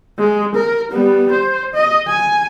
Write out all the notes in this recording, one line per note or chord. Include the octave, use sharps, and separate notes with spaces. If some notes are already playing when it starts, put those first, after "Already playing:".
G#3
A#4
G3 B3
C5
D#5
G#5